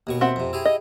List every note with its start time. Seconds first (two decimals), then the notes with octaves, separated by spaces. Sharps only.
0.07 D#2 B2 C#6
0.21 C4 E5 F#5
0.36 F2 C3
0.53 E4 G4 G#4
0.65 D#5